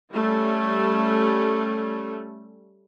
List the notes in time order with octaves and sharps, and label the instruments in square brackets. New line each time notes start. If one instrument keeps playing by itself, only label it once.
[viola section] G3 A3 C#4